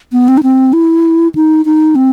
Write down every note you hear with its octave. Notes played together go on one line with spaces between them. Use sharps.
B3
C4
D#4
C4
E4
D#4
D#4
C4